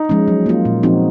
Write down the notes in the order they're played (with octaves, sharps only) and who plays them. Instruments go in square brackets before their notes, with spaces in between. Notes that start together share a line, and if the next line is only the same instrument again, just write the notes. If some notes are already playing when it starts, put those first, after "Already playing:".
Already playing: [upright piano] D#4
[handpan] F3 G#3 C#4
F#3
A#3 F4
A#2
F3 C4 D#4 F#4